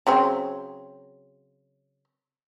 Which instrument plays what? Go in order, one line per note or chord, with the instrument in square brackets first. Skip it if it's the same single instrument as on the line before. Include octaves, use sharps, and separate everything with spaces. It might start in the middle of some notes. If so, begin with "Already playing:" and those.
[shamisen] C#3 F#3 C4